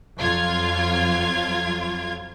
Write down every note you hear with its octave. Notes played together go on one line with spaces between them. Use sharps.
F2 F#3 F4 G#6